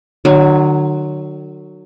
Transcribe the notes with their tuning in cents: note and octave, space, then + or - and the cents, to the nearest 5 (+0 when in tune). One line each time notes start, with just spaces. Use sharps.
D3 +45 F#3 +0